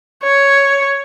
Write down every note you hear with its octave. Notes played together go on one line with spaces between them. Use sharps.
C#5